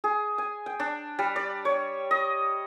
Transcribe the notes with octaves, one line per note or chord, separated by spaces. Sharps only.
G#4
G#5
G5
D4
G3
D5
C#5
D#5